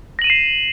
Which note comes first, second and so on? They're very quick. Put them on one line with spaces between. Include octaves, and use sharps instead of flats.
A#6 F#7 D#7 E7 C7